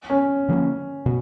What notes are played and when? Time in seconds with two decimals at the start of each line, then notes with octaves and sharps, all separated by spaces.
0.10 C#4
0.49 D3 F3 A#3 C#4
1.06 B2